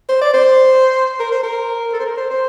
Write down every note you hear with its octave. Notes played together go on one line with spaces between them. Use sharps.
C5
D5
C5
A#4
C5
A#4
A4
C5
A#4
C5
C5